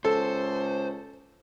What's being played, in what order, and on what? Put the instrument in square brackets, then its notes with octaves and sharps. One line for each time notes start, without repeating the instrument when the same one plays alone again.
[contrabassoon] C#2 [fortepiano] A4 [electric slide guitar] C5